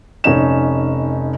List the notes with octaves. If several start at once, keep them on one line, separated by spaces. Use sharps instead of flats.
F1 C#4 D#4 E7